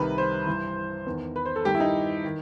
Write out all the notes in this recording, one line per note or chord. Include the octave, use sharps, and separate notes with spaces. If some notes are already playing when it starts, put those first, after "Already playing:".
Already playing: C2 C3 D#3 B4
C5
G2 E3
E2 D#3
B4
C5
A4
G2 D#3 G4
E4
D#4
D#3